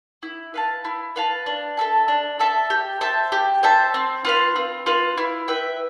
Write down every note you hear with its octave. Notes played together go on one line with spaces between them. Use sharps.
E4
B4 F5 A5
E4
B4 F5 A5
D4
A4 E5 A5
D4
A4 E5 A5
G4
C5 E5 A5
G4
C5 E5 A5
C4
F4 B4 F5
C4
F4 B4 F5
E4
B4 E5 G5